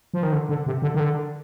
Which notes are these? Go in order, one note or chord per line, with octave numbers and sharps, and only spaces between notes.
F3
D#3
D3
D3
C3
D3
D#3
D3